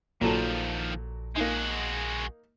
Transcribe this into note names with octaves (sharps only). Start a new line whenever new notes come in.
A#1 A#2 D#3 F3 F#3 A4
G#3 A#3 D#4 F#4